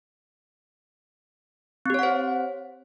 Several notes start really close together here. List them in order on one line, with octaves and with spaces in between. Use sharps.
C4 G4 C#5 F#5 C5